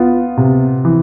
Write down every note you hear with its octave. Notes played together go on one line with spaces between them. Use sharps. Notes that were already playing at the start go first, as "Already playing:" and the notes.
Already playing: B3 F4
C3
E3